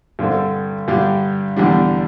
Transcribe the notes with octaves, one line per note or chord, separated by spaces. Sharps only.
G2 D3 C4 A4
G2 D3 G3 D4
E2 D3 G3 D4